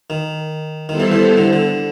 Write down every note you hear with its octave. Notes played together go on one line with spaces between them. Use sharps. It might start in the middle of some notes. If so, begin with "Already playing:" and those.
D#3
D#3 G3 B3 E4 A4 C5
E3
E3
D3
D3